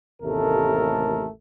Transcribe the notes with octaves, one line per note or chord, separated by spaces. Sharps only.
A1 D#2 C3 A3 A4 A#4